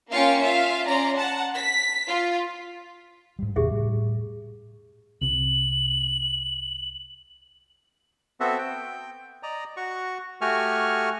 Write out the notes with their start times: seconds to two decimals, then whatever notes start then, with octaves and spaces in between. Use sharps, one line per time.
0.10 A#3 C#4 F4 F5 G5 C#7
0.42 F4 E5 F5
0.85 C#4 D5 A#5 C6
1.16 F#5 A5
1.56 B6
2.08 F4
3.39 G#2 G3
3.56 E2 A#2 C#3 G4 G#4 E5
3.71 A2 G3
5.21 C2 C3 F#7
8.40 B3 C4 F#4 A4 E5
8.58 G5
9.43 D5 D#5 A#5
9.77 F#4 C#6
10.41 A3 F#4 G4 G#5 C#6 F6